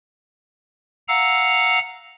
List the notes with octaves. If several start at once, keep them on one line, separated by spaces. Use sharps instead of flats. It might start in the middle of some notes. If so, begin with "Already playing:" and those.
F5 F#5 A#5 E6